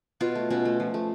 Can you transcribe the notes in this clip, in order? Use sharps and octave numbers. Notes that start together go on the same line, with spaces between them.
B2 F4
A3
B2 C#4
A3
F3
A3